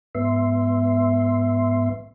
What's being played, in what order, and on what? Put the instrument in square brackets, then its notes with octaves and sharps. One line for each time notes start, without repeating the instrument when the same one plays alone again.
[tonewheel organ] G#2 B3 E5 C6